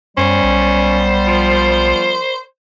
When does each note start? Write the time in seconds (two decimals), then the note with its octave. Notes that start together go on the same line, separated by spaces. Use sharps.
0.17 F#2 G3 B3 C#4 C5
0.44 B1
1.27 F3